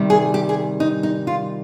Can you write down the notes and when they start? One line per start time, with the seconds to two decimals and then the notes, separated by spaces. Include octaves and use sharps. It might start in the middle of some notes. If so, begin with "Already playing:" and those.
Already playing: C3 D#3 G3
0.10 G#4
0.34 G4
0.49 G#4
0.80 D#4
1.03 D#4
1.27 F4